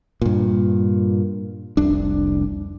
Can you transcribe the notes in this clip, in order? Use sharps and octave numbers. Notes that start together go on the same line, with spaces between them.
G2 A#2
F1 C2 D4